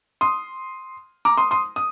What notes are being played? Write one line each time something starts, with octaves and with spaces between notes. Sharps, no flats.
C6 D#6
A#5 D6
C6 D#6
C6 D#6
D#6